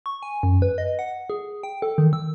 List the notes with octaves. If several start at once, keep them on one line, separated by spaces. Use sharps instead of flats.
C#6
G#5
F#2
B4
D#5
F#5
G#4
G5
A4
D#3
E6